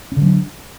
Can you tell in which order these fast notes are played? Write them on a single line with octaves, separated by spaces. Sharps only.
C#4 D3 F#3 D4